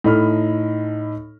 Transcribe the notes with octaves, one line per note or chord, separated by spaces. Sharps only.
A2 D#4 A4 D#5 B5 F6